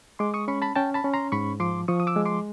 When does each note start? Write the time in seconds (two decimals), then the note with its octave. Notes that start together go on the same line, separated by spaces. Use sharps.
0.19 G#3 C6 D6
0.34 C#6 D#6
0.48 C#4 B5 C#6
0.62 A5 B5
0.75 C#4 G5 A5
0.94 A5 B5
1.04 C#4
1.14 A#5 C6
1.32 G#2 B5 C#6
1.60 F3 C6 D6
1.88 F3 C#6 D#6
2.00 D#6
2.07 D6 E6
2.16 G#3
2.25 C6 D6